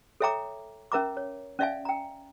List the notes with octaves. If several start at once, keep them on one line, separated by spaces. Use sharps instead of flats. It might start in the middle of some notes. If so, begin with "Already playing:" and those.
A4 C#5 E5 G5 A#5 D6
C#4 A#4 E5 A#5 D6
C#5
C#4 D5 E5 F5 G#5
G5 A#5